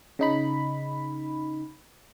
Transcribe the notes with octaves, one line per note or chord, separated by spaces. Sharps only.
C#3 D#4 B5